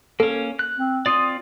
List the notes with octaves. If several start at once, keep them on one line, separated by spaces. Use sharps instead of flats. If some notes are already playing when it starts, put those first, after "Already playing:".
A#3 C#4 A4
F#6
C4
C4 F4 D5 D#6